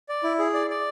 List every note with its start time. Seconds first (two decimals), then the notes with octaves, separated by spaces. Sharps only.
0.09 D5
0.23 E4
0.39 G#4
0.54 D5
0.70 D5